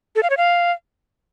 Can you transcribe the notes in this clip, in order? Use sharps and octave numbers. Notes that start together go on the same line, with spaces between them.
A4
F5
C#5
F5